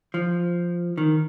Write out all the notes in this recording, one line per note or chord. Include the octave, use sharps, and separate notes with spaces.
F3
D#3